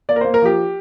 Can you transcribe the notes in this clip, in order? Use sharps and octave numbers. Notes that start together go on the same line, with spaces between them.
A#3 D5
A#4
A#3 C5
A#4
F3 G4